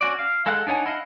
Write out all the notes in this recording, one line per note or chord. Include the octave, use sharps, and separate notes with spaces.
C#4 F#4 D5
F5
G#3 A4 F5 F#5 F#6
D4 D#4 C#5 F#5 G#5
E4 D#5 F5 F#5